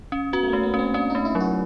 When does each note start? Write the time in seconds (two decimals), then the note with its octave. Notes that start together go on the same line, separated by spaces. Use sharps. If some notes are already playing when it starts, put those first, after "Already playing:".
0.12 C#4
0.33 B3 F#4
0.43 A3
0.48 A#3
0.53 A3
0.63 B3
0.74 C#4
0.79 C4
0.94 C#4 D4
1.10 D#4
1.15 A3
1.25 E4
1.35 F#3
1.40 F#4